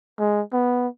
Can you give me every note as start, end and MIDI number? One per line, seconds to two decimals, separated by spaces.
0.19 0.41 56
0.53 0.88 59